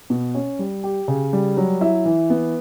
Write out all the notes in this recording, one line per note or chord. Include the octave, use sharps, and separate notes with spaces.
B2
C#4
G3
G4
C#3
G3
F#3
E4
E3
B3